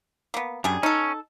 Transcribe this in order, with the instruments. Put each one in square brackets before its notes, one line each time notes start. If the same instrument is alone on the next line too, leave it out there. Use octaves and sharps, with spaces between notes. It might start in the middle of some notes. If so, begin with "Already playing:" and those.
[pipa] A#3 B3
[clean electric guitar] F#2 [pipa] G3 D4 G#4
[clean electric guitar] C#4 [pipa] D#4 A4